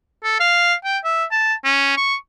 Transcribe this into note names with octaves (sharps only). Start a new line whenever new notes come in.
A4
F5
G5
E5
A5
C#4
C#6